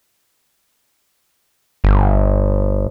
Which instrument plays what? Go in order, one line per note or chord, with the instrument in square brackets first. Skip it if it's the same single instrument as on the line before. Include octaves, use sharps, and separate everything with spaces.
[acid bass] G1